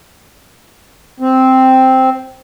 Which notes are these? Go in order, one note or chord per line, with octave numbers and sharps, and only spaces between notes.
C4